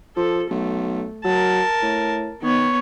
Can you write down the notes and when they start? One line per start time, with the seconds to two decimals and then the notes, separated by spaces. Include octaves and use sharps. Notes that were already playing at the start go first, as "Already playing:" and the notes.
0.16 F3 A4
0.50 B1 A3
1.24 F#3 A#4 A5
1.82 A2
2.42 D#3 B3 C#5